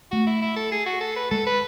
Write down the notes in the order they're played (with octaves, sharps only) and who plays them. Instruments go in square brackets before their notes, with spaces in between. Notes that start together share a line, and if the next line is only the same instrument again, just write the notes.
[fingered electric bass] A3 [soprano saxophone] F#4
[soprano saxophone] E4
E4
A4
G#4
F#4
A4
B4
[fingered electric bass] G#3 [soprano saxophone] A4
[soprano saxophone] B4